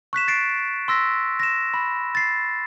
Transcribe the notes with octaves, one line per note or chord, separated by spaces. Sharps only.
C#6 F#6 B6 E7
A6 B6 C7 D7
C6 E6 A#6 B6
A#6 E7
B5
A6 C7